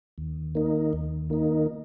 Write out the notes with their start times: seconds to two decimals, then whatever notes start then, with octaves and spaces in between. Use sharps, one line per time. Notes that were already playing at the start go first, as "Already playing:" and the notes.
0.18 D#2
0.55 D#3 A#3 D#4
0.93 D#2
1.30 D#3 A#3 D#4